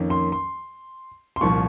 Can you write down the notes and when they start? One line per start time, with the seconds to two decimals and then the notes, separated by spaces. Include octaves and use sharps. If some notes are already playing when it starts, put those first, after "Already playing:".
Already playing: F2 D#3 A#3 C#4
0.10 C6
0.32 C6
1.36 C6
1.41 C2 A#2 F3 C#6